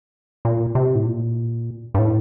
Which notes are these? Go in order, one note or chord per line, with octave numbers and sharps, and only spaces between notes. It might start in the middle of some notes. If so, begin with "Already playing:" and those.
A#2
C3
A2
A#2
G2
A2